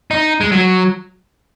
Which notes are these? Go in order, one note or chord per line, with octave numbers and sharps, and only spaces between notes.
D#4
G#3
F#3